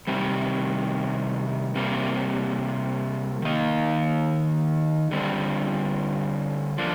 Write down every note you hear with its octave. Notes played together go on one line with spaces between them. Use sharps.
C3 D#3 G3
C3 G3 A#3
D#3 A#3 D#4
D3 G3 C4
F3 A#3 D4